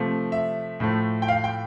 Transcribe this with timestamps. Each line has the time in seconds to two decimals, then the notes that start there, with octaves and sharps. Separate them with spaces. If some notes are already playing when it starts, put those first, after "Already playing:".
Already playing: C3 F3 A3
0.32 E5
0.80 A2 F3 A3
1.22 G5
1.28 F5
1.44 G5